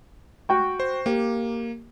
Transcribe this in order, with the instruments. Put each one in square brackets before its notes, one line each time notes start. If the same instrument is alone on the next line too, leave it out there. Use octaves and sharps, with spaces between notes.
[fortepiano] F#4 G5 C#6
[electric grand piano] C5
[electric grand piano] A#3 [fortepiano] G4